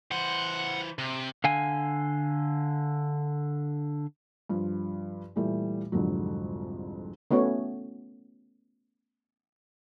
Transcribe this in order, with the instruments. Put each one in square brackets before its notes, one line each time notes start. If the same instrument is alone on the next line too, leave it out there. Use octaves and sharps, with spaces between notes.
[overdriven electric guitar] E3 C5 [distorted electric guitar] F#5
[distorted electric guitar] C3
[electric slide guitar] D3 F5 G#5
[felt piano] G2 F3
A#2 E3 G3 A3
C2 F2 G#2 D3 F#3
[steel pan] A3 B3 C#4 F#4 C#5